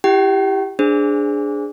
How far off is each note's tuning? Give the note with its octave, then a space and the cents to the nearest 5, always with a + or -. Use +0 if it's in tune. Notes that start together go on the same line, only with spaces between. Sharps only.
E4 +25 G4 +5 G5 -40
D4 +0 G#4 +0 C5 +0